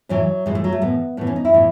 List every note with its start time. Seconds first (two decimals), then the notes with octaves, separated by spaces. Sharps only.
0.09 A2 E3 F#3
0.46 A2 E3 G#3
0.55 A3
0.64 F#3
0.72 A3
0.82 A2 E3 B3
1.17 A2 E3 B3
1.27 C#4
1.36 D#4
1.45 E4
1.54 A2 E3